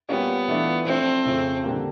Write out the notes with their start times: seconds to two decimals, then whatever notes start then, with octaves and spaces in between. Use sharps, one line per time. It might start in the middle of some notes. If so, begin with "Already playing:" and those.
0.09 G3 A#3 B3 C#4 F4
0.48 E3 A3 D4 F4
0.86 F3 A3 C4 D4
1.25 F2 C#3 F3 A3
1.64 D3 G3 A#3